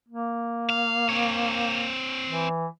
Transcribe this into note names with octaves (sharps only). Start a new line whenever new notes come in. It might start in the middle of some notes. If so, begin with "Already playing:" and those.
A#3
F5
C4 C#5
E3